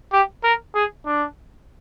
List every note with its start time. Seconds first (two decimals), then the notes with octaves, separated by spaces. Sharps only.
0.13 G4
0.44 A#4
0.75 G#4
1.06 D4